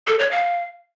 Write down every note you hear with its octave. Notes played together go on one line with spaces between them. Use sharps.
A4
C#5
F5